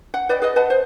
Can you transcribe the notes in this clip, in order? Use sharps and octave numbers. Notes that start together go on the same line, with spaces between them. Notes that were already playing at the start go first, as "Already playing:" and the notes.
F#5
B4 D5 D#5 G5
G#4 B4 D#5
B4 D#5 F#5 A5
C5